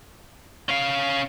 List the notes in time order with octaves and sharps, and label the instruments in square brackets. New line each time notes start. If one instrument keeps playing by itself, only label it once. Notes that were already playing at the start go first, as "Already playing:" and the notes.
[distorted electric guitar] C#4 F5